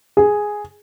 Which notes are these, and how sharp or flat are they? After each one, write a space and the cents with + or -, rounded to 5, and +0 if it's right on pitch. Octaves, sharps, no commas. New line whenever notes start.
G#4 +0